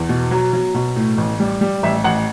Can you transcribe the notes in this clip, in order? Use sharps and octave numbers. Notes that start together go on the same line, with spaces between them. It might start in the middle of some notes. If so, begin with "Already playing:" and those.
Already playing: E2
B2
F#3
F#3
B2
A2
A1
G3
G3
A1 E5
A1 F#5